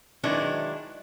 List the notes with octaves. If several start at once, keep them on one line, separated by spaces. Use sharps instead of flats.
D#3 F#3 G#3 D4 E4 B4